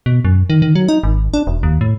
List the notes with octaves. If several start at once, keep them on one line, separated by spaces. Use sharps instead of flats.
B2
F#2
D#3
D#3
F#3
D#4
G#1
D4
E1
D#2
A2